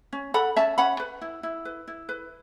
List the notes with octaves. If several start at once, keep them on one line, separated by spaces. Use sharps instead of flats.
C#4
A4 F#5 B5
C#4 E5 A5
C#4 F#5 B5
B4
E4
E4
B4
E4
B4